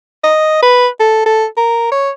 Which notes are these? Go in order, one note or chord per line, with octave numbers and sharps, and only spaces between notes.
D#5
B4
A4
A4
A#4
C#5